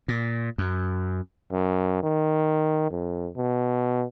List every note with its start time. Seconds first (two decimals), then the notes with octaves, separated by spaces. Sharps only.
0.08 A#2
0.58 F#2
1.52 F#2
2.03 D#3
2.90 F2
3.37 B2